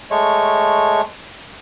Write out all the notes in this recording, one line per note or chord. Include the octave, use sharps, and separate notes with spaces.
G#3 A3 C#5